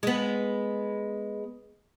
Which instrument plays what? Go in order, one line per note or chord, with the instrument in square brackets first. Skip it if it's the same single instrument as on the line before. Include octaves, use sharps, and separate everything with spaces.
[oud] G#3 B3